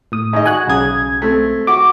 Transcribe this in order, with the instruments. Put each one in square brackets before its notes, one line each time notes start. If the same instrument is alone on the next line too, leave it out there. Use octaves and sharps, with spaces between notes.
[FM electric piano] A2 D#6
[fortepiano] G#2 D#5
[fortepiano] F#4 [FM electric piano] G#5 F#6
[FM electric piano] B1 G#6 [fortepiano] C#3 D#6
[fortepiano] A3 C4
[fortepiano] F#4 [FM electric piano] D6